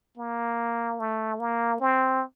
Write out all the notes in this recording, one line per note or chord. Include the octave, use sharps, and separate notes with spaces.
A#3
A3
A#3
C4